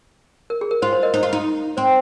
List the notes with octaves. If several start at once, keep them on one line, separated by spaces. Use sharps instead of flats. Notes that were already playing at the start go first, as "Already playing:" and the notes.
A#4
G#4
A#4
F4 C5
C5
A#4 D#5
D#4 C5
F4
D#4
C4 C5